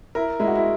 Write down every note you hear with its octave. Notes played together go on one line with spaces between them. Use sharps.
E4 A#4
G#3 E4
F#4
E4